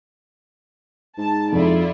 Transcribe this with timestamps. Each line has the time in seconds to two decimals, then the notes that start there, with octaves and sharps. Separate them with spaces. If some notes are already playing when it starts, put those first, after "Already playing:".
1.18 G#2 A5
1.53 F2 E4 F4 D5